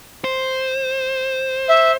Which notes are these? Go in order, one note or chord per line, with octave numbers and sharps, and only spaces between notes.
C5
E5